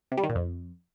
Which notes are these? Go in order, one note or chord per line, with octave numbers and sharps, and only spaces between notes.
C3
G3
D#3
A#2
F2